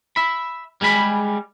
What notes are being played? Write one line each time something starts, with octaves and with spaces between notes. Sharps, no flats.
E5 B5
G3 G#3 G#4 B5